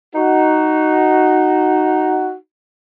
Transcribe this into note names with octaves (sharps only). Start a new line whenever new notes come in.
D#4 F#4